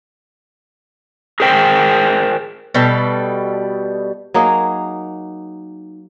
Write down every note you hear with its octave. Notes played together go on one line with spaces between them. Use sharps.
G#4 A#4 C5 G5
B2 G3 A4
F#3 A#3 D#4 G#4